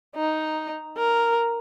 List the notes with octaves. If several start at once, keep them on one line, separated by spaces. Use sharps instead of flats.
D#4
A#4